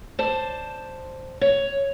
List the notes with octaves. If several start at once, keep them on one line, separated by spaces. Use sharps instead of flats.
C5 D5 A5
C#5